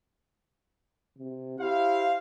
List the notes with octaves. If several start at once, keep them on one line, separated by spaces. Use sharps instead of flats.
C3
E4 G4 C5 F5